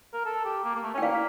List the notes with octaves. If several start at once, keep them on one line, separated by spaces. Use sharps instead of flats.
A#4
A4
G4
A#3
A#3
A3
C#4
G5
A#3 D5 F5